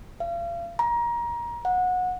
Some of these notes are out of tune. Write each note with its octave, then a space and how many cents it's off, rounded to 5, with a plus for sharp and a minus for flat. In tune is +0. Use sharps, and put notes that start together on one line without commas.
F5 -35
A#5 +25
F#5 -20